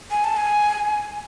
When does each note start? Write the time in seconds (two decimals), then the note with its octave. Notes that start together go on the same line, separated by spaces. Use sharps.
0.11 G#5
0.24 A5
0.37 G#5